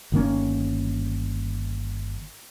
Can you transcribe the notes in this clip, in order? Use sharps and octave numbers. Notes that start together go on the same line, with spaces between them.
G1 D#3 A#3 C#4